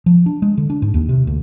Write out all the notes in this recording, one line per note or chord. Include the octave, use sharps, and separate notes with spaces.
F3
D4
G#3
D3
D4
G#2
D#2
C3
D2